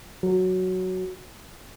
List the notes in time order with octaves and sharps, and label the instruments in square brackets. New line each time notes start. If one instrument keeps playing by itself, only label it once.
[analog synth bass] F#3